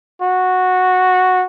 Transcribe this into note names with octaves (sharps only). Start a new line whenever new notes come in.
F#4